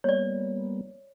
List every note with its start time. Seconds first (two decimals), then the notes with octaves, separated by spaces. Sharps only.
0.04 G3 A#3 B3 C#5 D5